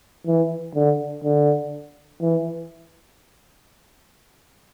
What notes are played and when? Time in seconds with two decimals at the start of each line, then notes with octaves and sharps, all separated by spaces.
0.26 E3
0.75 D3
1.24 D3
2.21 E3